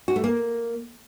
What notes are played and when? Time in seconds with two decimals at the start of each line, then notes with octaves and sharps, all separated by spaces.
0.08 F#4
0.16 A3
0.24 A#3